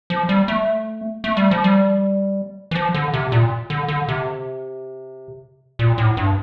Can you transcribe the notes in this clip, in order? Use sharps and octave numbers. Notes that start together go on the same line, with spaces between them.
F3
G3
A3
A3
G3
F3
G3
E3
F3
D3
C3
A#2
D3
D3
C3
A#2
A2
G2